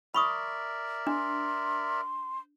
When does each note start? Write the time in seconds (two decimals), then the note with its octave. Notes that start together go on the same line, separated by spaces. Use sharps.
0.14 A#4 D5 E5 B5 C#6 D#6
1.07 D4 C6